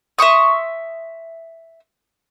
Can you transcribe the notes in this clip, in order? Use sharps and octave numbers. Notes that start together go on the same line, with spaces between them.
E5 C6 C#6 D#6